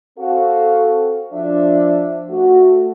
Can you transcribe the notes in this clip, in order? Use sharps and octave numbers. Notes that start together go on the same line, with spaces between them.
C4 F#4 A4 F5
F3 D4 D5 E5
A3 F#4